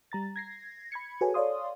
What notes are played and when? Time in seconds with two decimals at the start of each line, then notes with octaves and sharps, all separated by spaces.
0.12 G3 A#5 A6
0.36 G#6 A#6 C7
0.92 B5 G#6 C#7
1.21 F#4 G#4 A4 B4 C#5 G#5
1.34 A4 C#5 D5 F5 C6 D#6